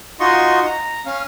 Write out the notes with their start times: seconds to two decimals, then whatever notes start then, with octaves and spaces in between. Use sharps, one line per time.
0.20 D#4 F4 F#4 D#5 C6 C#6
0.66 A#5
1.06 C#4 F5